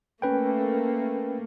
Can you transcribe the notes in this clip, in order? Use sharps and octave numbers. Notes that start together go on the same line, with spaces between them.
A3 A#3 C#4 B4 G5